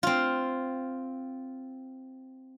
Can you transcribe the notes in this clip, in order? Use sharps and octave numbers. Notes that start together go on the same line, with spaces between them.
C4 F4